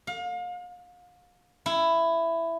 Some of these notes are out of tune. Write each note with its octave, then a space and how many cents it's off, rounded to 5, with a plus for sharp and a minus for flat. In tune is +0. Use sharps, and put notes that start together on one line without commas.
F5 +35
E4 +10